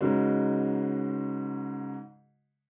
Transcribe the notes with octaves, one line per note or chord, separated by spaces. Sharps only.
G#2 C#3 G#3 B3 D#4 F#4